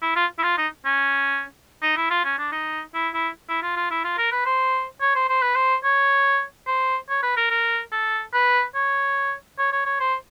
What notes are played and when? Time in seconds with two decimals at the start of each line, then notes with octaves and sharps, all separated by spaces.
0.02 E4
0.16 F4
0.39 E4
0.44 F4
0.58 D#4
0.85 C#4
1.82 D#4
1.97 E4
2.10 F4
2.24 C#4
2.38 D4
2.52 D#4
2.94 E4
3.14 E4
3.49 E4
3.63 F4
3.76 F4
3.90 E4
4.04 F4
4.18 A#4
4.32 B4
4.46 C5
5.01 C#5
5.15 C5
5.29 C5
5.42 B4
5.55 C5
5.84 C#5
6.67 C5
7.09 C#5
7.23 B4
7.37 A#4
7.50 A#4
7.92 A4
8.33 B4
8.75 C#5
9.58 C#5
9.72 C#5
9.86 C#5
10.00 C5